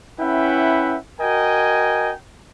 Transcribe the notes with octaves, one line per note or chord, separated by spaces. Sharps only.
C#4 E4 B4 E5 F#5 G5
F#4 A#4 D#5 G5 G#5